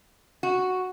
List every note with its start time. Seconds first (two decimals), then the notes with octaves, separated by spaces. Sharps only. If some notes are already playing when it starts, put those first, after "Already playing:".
0.43 F#4